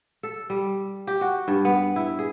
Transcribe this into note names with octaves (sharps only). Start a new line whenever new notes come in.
A4
G3
G4
F#4
G2
B3
E4
G#4